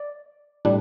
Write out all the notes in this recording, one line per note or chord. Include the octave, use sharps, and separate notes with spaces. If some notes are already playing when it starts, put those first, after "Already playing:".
Already playing: D5
A2 G3 D4